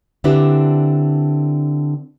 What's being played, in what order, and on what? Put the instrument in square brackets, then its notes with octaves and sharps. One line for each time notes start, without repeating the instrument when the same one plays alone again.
[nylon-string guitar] D3 C4 D4 E4 G4 B4